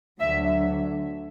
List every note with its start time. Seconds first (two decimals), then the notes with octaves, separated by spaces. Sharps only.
0.20 D2 D3 F#3 E5